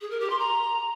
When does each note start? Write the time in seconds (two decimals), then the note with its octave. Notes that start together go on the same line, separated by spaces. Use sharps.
0.01 G#4
0.10 A#4
0.20 G4
0.30 C6
0.39 A#5